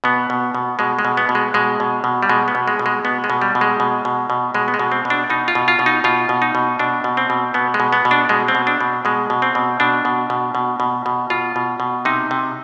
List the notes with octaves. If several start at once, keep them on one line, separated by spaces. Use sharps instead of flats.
B2 B3
B2
B2
B2 G#3
G#3
B2
B3
B2
G#3
B2 G#3
B2
B2
G3
B2 G#3
B3
B2
G#3
B2
G#3
B2 B3
G#3
B2
G3
B2
G#3
B2
B2
B2
B2 G#3
B3
G#3
B2
C4
B2
D4
B2 D#4
F4
B2
F4
B2
D#4
B2 F4
B2
D#4
B2
B2 D4
B2
C4
B2
B2 B3
G#3
B2
B3
B2
D4
B2 G#3
C4
B2
D4
B2
B2 G#3
B2
C4
B2
B2 D4
B2
B2
B2
B2
B2
B2 F4
B2
B2
C3 D#4
C3